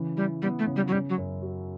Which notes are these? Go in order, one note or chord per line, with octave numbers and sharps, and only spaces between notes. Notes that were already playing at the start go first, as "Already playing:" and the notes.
Already playing: C#3 E3
G3 E4
G3 B3
A3
C#3
G3
F#3
C#3 G3
F#3
F#2
F#3